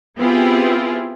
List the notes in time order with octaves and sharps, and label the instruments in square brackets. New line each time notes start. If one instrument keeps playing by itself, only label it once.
[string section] B3 C4 E4 F4 G4 G#4